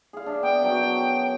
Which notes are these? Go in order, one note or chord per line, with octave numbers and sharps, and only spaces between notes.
G#4 F5
D4 E5
B3 G5
F#2 F#3